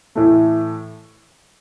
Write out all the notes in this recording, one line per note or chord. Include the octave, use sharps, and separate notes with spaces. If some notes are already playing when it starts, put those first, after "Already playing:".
A2 E3 A3